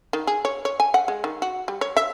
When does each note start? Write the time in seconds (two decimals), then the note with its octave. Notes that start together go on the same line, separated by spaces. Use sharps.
0.13 D#3
0.27 G#4
0.45 C#5
0.65 C#5
0.80 G#5
0.94 F#5
1.08 G#3
1.24 D#3
1.42 F#4
1.68 G3
1.81 C#5
1.97 E5